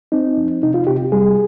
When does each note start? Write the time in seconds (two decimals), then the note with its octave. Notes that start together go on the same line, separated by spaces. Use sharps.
0.12 C4 D#4
0.37 F2
0.63 C3 D#4
0.74 F4
0.87 C3 G4
1.12 G3 G#4